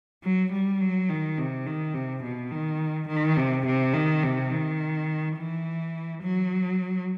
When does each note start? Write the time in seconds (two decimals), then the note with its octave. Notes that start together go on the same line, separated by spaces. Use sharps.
0.24 F#3
0.53 G3
0.81 F#3
1.10 D#3
1.38 C3
1.66 D#3
1.94 C3
2.23 B2
2.51 D#3
3.08 D#3
3.37 C3
3.66 C3
3.94 D#3
4.23 C3
4.51 D#3
5.37 E3
6.23 F#3